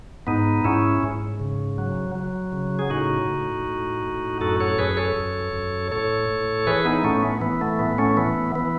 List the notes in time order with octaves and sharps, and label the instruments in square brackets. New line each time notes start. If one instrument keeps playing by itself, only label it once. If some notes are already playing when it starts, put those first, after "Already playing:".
[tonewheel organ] G#2 B3 D#4
G#2 C#4 E4
G#2
C#3
F#3
F#3
C#3
G#4
A2 D#4 F#4
A2
A2
A2
F#2 F#4 A4
A4 C#5
F#2 G#4 B4
A4 C#5
F#2
F#2
A2 A4 C#5
A2
E3 G#4 B4
B3 D#4
A2 A3 C#4
B3
E3 B3
A3
A2 B3
A3 C#4
E3 B3
E3 B3